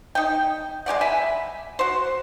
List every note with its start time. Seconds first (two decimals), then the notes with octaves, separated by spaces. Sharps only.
0.15 D#4 G5
0.86 G#3 G4 D5 F#5
1.01 E5 G#5 B5
1.79 F#4 C5